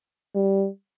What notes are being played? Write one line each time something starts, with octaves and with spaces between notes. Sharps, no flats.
G3